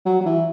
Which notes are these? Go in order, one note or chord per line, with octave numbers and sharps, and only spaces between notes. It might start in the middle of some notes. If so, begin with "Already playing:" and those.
F#3
F#3
E3